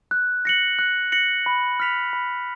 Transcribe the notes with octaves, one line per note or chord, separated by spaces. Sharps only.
F#6
A#6 C#7 F#7
F#6
A#6 C#7 F#7
B5
F6 B6 F7
B5